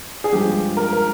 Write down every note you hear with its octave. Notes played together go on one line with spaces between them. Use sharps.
G#4
G2 F3 G#3 G4
A#4
A#4